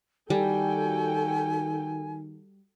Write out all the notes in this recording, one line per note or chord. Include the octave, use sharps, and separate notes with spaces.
D#3 G3 F#4 A4 G5 G#5